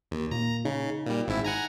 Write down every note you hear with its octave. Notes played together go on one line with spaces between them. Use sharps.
D#2
A#2 A#3 A#5
C#3 D#4
A#2 G3
G#1 G#2 E4
D#4 F#5 G#5 A#5